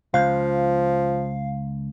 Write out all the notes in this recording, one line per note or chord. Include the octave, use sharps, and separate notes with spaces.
C#2 F3 F5